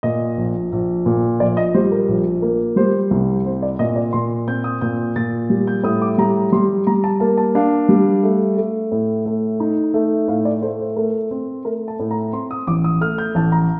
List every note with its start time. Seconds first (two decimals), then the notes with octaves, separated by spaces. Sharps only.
0.03 A#2 D#5
0.37 A#1
0.72 A#1
1.06 A#2
1.40 A#1 D5
1.57 D#5
1.74 G3 C5
1.92 A#4
2.08 A#1
2.42 A#3
2.76 G3 C5
3.11 C2
3.45 C4 C5
3.62 D5
3.79 A#2 D#5
3.96 D5
4.13 A#2 C6
4.48 C4 G6
4.64 D#6
4.81 A#2 G6
5.16 A#2 A6
5.50 G3
5.67 G6
5.84 A2 D#6
6.02 D6
6.18 G3 A#5
6.52 G3 C6
6.87 G3 A#5
7.04 A5
7.20 A#3 A5
7.37 A5
7.55 D4 F5
7.89 G3
8.23 A3
8.57 A3
8.92 A2
9.26 A3
9.60 D#4
9.94 A3
10.28 A2 F5
10.45 D5
10.62 A3 C5
10.79 C5
10.96 A3 A#4
11.31 C4
11.65 A3 A#4
11.88 A5
12.00 A2
12.11 A#5
12.33 C4 C6
12.51 D#6
12.67 A1 D6
12.84 D#6
13.01 A3 F6
13.18 G6
13.35 A1 A5
13.52 A#5